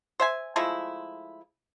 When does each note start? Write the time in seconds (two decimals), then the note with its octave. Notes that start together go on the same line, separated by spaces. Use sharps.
0.20 C5 E5 G#5
0.56 F3 G#3 A3 E4